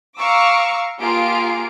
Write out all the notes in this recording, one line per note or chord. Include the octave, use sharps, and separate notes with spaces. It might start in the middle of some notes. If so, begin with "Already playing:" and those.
F5 A#5 C#6 D6 E6
A#3 F4 G4 G#4 F5 D7